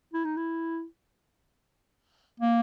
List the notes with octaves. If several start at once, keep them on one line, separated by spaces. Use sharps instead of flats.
E4
D#4
E4
A#3